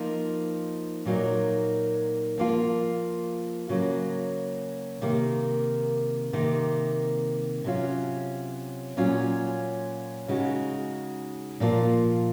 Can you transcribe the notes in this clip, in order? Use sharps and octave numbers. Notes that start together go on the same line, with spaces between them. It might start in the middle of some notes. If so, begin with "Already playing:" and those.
Already playing: F3 A#3 D#4
A#2 F#3 A#3 D#4
F3 A#3 F4
C#3 F#3 A#3
C3 D#3 A#3
C3 D#3 A#3
C3 F#3 C#4 F4
A#2 F#3 C#4 F4
C#3 G#3 D#4 F#4
A#2 F3 A#3 F4